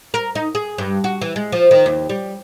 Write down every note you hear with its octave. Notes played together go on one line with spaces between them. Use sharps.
A#4
D#4
G#4
G2
F#4
E3
G#3
F3
D#3
D#2
G3